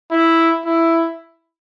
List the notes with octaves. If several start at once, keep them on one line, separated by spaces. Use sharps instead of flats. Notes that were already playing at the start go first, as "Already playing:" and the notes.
E4
E4